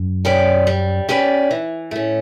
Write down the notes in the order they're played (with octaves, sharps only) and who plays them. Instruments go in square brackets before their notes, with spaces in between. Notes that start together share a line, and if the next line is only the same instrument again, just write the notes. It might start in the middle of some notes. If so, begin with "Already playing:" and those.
Already playing: [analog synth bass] F#2
[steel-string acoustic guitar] C#4 G4 B4 D5
G3
C#4 G4 B4 D5
E3
[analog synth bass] A2 [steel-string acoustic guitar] A3 C#4